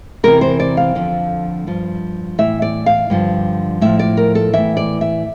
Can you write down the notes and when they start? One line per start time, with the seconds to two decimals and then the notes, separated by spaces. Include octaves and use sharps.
0.23 E2 C3 E3 A#4
0.41 C5
0.60 D5
0.77 F5
0.95 F2 D3 F3
1.67 G2 F3
2.38 A2 E3 E5
2.62 D5
2.86 F5
3.10 G2 D3 F3
3.81 A2 F3 E5
3.99 D5
4.17 A#4
4.35 A4
4.53 A2 E3 E5
4.77 D5
5.01 E5